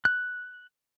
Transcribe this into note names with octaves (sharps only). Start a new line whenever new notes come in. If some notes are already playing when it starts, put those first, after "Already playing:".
F#6